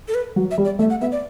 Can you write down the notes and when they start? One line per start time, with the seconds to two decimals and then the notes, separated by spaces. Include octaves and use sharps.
0.08 A4
0.14 B4
0.36 F#3
0.51 E5
0.58 G3
0.65 D5
0.79 A3 E5
0.90 F#5
1.01 B3 E5
1.12 D5